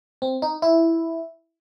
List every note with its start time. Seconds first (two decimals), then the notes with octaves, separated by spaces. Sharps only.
0.22 C4
0.42 D#4
0.62 E4